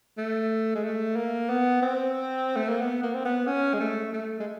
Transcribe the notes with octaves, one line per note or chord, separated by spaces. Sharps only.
A3
G#3
A3
A#3
B3
C4
A3
A#3
B3
A#3
C4
B3
C#4
G#3
A3
A3
G#3